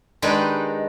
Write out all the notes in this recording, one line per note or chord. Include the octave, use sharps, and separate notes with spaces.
D#3 G#3 D4 D#4 G4 B4